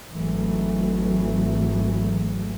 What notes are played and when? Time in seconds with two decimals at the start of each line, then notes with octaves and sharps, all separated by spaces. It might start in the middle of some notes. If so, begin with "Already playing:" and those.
0.12 G#1 G#2 E3 F#3 A3